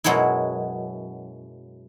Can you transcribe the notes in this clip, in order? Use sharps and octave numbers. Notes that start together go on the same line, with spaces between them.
F#2 B2 F#3 G#3 E4